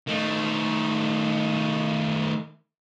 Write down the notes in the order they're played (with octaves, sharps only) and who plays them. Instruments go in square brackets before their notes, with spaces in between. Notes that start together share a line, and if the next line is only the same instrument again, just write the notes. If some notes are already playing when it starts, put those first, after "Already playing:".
[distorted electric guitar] D#3 A3